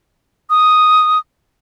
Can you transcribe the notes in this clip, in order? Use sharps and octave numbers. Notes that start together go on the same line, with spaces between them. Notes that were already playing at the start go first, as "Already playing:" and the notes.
D#6